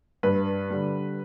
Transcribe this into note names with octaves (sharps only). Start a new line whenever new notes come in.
G2 B4
D3 G3